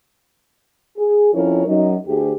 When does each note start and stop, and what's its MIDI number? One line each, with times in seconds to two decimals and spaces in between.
0.97 1.30 68
1.34 1.65 41
1.34 1.65 53
1.34 1.65 61
1.34 1.65 64
1.34 1.65 70
1.34 1.65 73
1.65 1.96 42
1.65 1.96 54
1.65 1.96 63
2.06 2.32 38
2.06 2.32 67
2.06 2.32 68